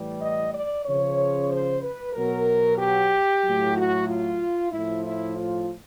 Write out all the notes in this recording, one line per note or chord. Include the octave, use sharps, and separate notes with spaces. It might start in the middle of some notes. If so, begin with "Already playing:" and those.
Already playing: A2 E3 G3
D#5
D5
C#3 F3 C#5
C5
B4
B2 F#3 A#4
G4
A2 F#3
F#4
F4
A2 F3 E4
E4
F4